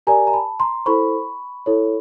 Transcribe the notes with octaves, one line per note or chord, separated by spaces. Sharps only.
G4 A#4 D5 G#5 A#5
A#5
A5 B5
A#5 C6
E4 A4 C5 B5 C#6
E4 A4 C#5